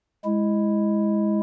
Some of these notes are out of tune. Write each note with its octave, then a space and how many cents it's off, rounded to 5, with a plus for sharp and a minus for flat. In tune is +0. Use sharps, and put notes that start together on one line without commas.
G#3 +0 E4 +0